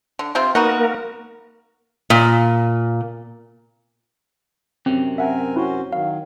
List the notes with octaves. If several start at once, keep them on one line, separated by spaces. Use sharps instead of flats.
D3
C3 C4 F4
A#3 B3 D#4 F#4 A#4
A#2
F#2 C3 C4
C4 A#4 E5 F#5 G#5
C#4 E4 F#4 C5
D#3 F#3 F5